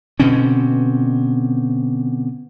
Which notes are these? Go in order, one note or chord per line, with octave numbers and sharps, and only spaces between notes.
B2 D3 C4 C#4